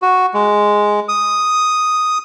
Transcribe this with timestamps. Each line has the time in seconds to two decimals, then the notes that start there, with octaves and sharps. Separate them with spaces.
0.02 F#4
0.34 G#3
1.08 D#6